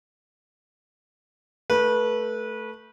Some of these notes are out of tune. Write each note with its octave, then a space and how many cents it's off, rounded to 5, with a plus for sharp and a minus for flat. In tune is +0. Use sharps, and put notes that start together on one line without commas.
A3 +0 B4 -25